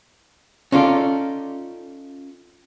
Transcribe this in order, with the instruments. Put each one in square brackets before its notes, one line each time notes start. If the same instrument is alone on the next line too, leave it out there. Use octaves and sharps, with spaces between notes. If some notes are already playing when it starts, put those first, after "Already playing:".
[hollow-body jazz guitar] C#4 D#4 F4 A4 D5